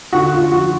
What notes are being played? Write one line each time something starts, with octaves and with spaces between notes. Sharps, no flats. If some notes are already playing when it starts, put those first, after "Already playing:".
D3 F#4
F4
F3 F#4